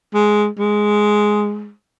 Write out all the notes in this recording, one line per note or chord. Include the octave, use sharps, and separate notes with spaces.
G#3
G#3